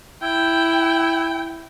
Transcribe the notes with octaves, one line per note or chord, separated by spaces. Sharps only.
E4 G5